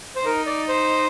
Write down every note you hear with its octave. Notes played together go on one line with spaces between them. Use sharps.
C5
D#4 A#4
D5
C5